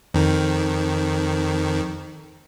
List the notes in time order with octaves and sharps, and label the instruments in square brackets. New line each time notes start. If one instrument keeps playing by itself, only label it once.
[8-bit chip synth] F2 D#3